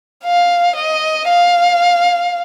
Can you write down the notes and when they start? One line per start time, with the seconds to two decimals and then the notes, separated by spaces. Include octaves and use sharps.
0.24 F5
0.76 D#5
1.29 F5